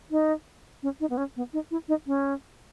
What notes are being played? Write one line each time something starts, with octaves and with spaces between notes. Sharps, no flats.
D#4
C#4
D#4
B3
C#4
B3
D#4
E4
D#4
C#4